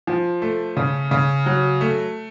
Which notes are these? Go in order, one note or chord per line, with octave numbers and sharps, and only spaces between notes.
F3
A3
C#3
C#3
F#3
A3